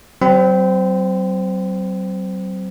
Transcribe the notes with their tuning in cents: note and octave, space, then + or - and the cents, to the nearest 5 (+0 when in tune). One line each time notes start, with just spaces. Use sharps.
F#3 +40 C4 -15 B5 +40